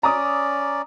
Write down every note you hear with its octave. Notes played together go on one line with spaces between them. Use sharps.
C#4 D5 A#5 D6 D#6